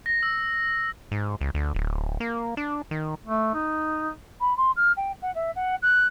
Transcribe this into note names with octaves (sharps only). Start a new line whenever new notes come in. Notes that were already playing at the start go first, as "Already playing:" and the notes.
A#6
E6
G#2
C#2
D2
D1
A#3
D4
D#3
A3
D#4
B5
C6
F6
G5
F#5
E5
F#5
F#6